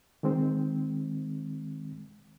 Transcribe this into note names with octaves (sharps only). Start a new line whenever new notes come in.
D#3 G#3 C4